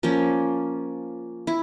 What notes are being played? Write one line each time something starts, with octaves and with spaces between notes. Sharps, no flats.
F3 A#3 C#4
E4